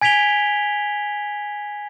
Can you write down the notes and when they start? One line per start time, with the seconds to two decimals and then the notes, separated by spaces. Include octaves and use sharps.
0.01 G#5 G#6 B6 D7 F7 G7